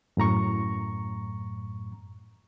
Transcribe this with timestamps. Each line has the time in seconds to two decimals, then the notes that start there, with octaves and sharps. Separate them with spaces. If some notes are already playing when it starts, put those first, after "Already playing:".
0.17 F#2 A2 A#5 C#6